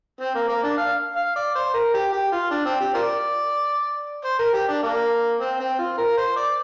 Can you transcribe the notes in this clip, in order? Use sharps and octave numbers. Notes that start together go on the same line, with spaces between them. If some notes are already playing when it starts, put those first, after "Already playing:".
C4
A#3
A#3
D4
F5
F5
D5
C5
A#4
G4
G4
F4
D4
C4
G4
F4 A#4 D5
C5
A#4
G4
D4
A#3
C4
C4
F4
A#4
C5
D5